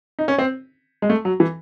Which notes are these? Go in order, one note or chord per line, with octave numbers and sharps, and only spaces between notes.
D#4
C#4
C4
G#3
A3
F#3
E3